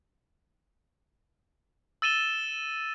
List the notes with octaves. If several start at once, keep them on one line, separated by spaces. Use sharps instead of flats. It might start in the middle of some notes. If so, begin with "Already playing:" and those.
E6 A6 D#7 E7 G7